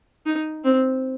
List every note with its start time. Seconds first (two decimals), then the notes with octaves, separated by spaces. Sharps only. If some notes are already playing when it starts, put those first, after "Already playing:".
0.26 D#4
0.64 C4